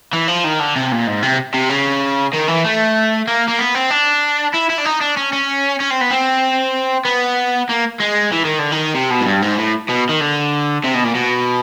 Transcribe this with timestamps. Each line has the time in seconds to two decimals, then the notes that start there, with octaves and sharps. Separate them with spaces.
0.13 E3
0.28 F3
0.44 D#3
0.59 D3
0.76 C3
0.92 A#2
1.07 G#2
1.23 C3
1.54 C3
1.70 C#3
2.33 D#3
2.48 E3
2.65 A3
3.28 A#3
3.48 A#3
3.59 B3
3.75 C4
3.91 D4
4.54 E4
4.70 E4
4.78 D4
4.85 D#4
5.01 D4
5.17 C#4
5.33 C#4
5.80 C#4
5.90 C4
6.01 B3
6.11 C4
7.05 B3
7.69 A#3
8.00 G#3
8.32 E3
8.45 D#3
8.59 D3
8.72 D#3
8.94 C3
9.10 B2
9.21 G#2
9.26 G2
9.42 G#2
9.58 A2
9.89 B2
10.09 D#3
10.21 D3
10.84 C3
10.94 B2
11.04 A#2
11.15 B2